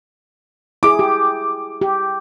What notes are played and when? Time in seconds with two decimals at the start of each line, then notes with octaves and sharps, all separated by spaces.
0.83 E4 G#4 D6
0.99 G4
1.81 G4